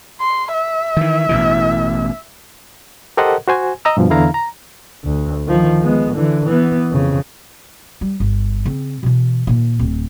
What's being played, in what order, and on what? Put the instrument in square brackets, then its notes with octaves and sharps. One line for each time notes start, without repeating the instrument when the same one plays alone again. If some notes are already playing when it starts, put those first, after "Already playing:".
[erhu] C6
E5
[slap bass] D#3 E3
A1 B2 E3
[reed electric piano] G4 A4 A#4 C5 D#5 F#5
F#4 C5 G#5
D#5 A#5 E6
G2 B2 F3
E2 D3 E4 F5 A#5
A#5
[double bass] D2
D#3 F3
G#3 B3
D3 E3
E3 B3
F2 C#3
[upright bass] G3
G1
C#3 C4
B2 E3
A#2 D#3
D1 C4